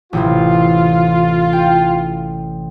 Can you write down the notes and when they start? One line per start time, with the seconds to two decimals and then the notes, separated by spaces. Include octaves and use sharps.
0.13 A1 C3 E3 F4
1.53 G5